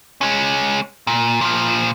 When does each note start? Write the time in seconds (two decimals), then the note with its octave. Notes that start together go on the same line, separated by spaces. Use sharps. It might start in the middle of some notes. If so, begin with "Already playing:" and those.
0.21 G#3 C#4
1.07 A#2
1.41 A#2 F3